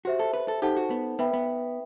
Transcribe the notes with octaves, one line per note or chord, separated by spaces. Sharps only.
F#4 G4 C5 E5
A4
B4
A4
D#4 G4 A4 C5 F#5 A5
F#4
B3
B3 B4 E5 G5 B5
B3